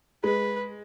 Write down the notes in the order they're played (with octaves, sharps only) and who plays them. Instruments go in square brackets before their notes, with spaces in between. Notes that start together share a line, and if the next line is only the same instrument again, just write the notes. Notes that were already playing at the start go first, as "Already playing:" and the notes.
[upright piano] G#3 [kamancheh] B4